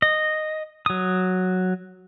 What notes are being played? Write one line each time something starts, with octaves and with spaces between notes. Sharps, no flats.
D#5
F#3 D#6